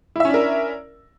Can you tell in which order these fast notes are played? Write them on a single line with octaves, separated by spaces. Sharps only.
E4 E5 C#4 D4 A#4